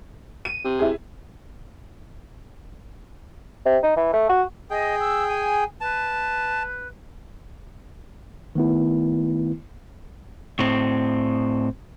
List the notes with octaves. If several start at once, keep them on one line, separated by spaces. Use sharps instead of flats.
D#7
C3
E4 G#4
C3
D#4
E3
A3
F#4
G#4 D#5 G5
E6
G#5
B4 A5
D#3 A3 B3 E4
A2 C4